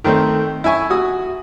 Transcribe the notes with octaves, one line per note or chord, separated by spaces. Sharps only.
D#3 A3 C4
E4 E5 G#5 C#6
F#4 D#6